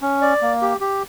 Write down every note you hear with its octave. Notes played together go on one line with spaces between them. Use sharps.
C#4
D5
A#3
G4
G4